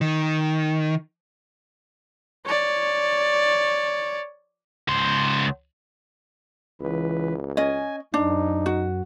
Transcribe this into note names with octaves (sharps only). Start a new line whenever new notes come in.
D#3
C#5 D5
C#2 C5
C#2 E3 B4
C#4 D#5 G#5
F#2 D4 D#4
F#4